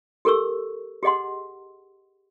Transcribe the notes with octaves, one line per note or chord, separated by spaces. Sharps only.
G4 A4 A#4 C#6 E6
G4 G#4 D#5 F#5 C6